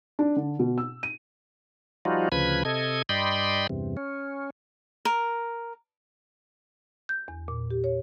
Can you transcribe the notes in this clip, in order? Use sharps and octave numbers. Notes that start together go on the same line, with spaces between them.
D4
D3
B2
E6
D#7
F3 G3 D#4 F4 F#4
D2 C#3 F3 B4 B5 G#6
C3 A4 D#5 G#6
G2 D5 D#5 G5 B5 C6
E2 G2 C3
C#4
A#4
G6
E2
A#2
G4
C#5